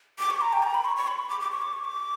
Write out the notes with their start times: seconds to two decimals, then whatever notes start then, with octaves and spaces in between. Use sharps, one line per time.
0.19 D6
0.30 C#6
0.41 A#5
0.53 G5
0.63 A#5
0.74 B5
0.85 C#6
0.96 C#6
1.08 B5
1.19 C#6
1.29 D6
1.40 D6
1.51 C#6
1.62 D6
1.73 C#6
1.84 D6